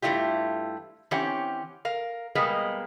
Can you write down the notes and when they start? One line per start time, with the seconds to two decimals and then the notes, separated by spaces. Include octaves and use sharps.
0.02 G2 E3 A3 E4 F4 G4
1.11 E3 C4 C#4 G4 F#5
1.85 A#4 F5
2.35 B2 G3 G#3 A#3 B3 G#4